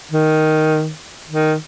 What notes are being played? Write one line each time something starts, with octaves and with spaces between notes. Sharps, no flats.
D#3
D#3